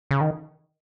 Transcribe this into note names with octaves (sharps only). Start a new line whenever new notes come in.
C#3
D#3